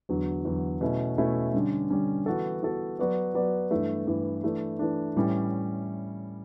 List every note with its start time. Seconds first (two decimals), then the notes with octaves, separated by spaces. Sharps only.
0.09 E2 D3 F#3
0.45 E2 D3 F#3
0.81 B2 A3 C#4 E4
1.18 B2 A3 C#4 E4
1.54 D3 G3 C#4
1.90 D3 G3 C#4
2.26 E3 B3 F#4 A4
2.63 E3 B3 F#4 A4
2.99 F#3 B3 F#4 B4 D5
3.34 F#3 B3 F#4 B4 D5
3.71 G2 E3 A3
4.07 G2 E3 A3
4.44 E3 A3 D4
4.79 E3 A3 D4
5.16 A2 E3 G3 C#4 E4